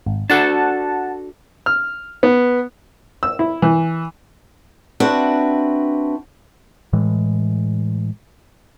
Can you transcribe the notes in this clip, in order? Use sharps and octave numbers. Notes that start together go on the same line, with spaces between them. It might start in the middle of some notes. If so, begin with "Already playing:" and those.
G#1
D4 F#4 A4 F#5 A5
F6
B3
E6
E4
E3
C4 D4 F#4 B4 E5
A2 E3 G#3